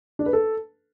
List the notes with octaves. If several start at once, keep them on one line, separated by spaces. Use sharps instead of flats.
D4
B4
A4